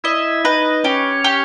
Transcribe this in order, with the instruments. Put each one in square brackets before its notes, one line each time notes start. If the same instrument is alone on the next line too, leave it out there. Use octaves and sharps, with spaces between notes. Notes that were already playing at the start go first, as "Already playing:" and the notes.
[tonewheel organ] E4 E5 [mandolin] D#5
[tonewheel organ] D#4 D#5 [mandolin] B4
[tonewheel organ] C#4 C#5 [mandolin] G4
[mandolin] G4